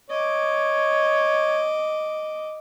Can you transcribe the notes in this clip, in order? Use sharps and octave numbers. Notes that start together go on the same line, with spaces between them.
C#5 D#5 D6